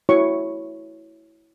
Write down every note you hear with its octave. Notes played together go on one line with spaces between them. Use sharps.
E4 F#4 C#5 E5 C#6